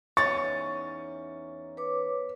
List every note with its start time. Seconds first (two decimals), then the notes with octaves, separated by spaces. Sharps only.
0.17 E2 C#4 D#4 C#6 A6
1.77 B4 C#5 D6